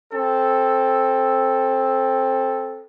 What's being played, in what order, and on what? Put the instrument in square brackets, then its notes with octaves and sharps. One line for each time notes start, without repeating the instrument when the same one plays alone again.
[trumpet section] C4 A4